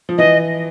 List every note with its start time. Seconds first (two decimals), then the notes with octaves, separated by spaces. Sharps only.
0.09 F3
0.18 E3 D#5